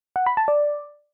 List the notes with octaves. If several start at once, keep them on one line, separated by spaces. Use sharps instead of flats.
F#5
B5
A5
D5